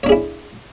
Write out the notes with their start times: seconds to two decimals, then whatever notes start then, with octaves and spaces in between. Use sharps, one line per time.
0.03 C#5
0.06 D4
0.09 G#4
0.12 E4